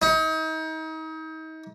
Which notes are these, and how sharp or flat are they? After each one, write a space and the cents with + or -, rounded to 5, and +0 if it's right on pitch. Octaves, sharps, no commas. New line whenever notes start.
D#4 +35